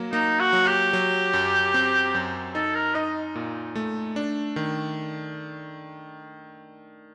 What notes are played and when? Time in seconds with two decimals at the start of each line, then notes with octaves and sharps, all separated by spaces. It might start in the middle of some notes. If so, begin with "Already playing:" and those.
Already playing: F#3 A#3
0.12 A#3 D#4
0.40 F#4
0.53 F#3
0.67 G4
0.93 F#3
1.33 F#2
1.74 C4
2.15 F#2
2.54 D#4 A4
2.75 A#4
2.95 D#4 D#5
3.35 A#2
3.75 A3
4.16 D4
4.56 D#3